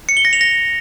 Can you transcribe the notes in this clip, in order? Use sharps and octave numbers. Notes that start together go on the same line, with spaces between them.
C#7
G7
A#6
F7
A#6